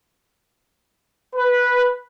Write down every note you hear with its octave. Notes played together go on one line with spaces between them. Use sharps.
B4